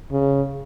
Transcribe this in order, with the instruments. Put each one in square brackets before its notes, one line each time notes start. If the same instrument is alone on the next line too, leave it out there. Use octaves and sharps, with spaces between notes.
[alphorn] C#3